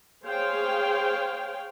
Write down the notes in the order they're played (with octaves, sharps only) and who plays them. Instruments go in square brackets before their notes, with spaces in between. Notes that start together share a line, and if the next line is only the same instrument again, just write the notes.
[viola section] G#4 C5 C#5 F5 G5